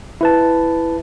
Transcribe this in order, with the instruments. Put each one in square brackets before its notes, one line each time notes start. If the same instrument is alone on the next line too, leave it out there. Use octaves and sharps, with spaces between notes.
[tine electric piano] E4 B4 A5